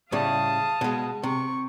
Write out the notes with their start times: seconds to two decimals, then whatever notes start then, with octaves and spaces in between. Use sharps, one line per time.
0.12 A2 C#3 G3 F5 A5 D#6
0.81 B2 G#3
1.23 C3 C#6